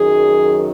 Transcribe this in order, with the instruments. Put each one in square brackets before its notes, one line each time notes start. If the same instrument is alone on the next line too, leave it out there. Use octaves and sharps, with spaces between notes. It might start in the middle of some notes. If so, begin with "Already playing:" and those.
Already playing: [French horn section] F#2 D#3 F#3 G#4